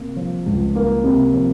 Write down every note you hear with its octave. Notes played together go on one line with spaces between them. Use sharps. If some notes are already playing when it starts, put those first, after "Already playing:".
Already playing: C3 A#3
F3
C#2
A#3
C3
F3